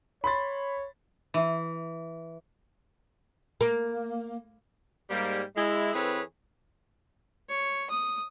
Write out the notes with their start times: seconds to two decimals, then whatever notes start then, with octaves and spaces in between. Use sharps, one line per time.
0.24 C#5 B5 C6 A6
1.34 E3
3.61 A#3
5.10 G#2 G3 A#3
5.56 G#3 E4
5.94 E3 C4 G#4 A4 B4 C#5
7.49 C#5
7.90 D#6